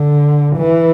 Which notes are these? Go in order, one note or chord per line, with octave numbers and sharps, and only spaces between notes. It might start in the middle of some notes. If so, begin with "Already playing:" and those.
Already playing: D3
E3